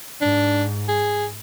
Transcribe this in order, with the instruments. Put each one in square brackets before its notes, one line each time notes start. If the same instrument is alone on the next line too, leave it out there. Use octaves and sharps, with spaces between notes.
[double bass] G#2 [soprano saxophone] D4
[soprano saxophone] G#4